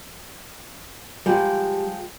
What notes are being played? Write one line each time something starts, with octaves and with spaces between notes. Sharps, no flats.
F3 G3 G#3 G5